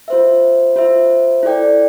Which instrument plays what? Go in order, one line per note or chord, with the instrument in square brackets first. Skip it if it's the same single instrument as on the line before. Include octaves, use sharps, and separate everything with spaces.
[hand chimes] F4 C5 E5
F4 C5 E5
E4 A4 D5 G5